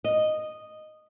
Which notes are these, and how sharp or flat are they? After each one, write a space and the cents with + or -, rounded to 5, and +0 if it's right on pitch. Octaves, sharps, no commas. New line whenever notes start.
D#5 -10